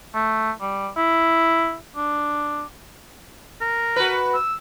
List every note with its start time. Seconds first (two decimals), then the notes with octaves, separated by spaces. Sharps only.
0.15 A3
0.61 G3
0.97 E4
1.96 D4
3.61 A#4
3.96 F#4 B4
4.34 E6